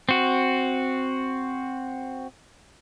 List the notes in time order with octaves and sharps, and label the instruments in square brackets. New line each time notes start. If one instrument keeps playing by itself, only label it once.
[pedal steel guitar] C4 F#4